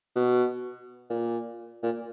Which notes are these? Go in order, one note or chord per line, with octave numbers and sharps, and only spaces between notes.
B2
A#2
A#2